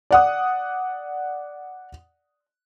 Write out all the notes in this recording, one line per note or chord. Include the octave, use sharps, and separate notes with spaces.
D5 F#5 D#6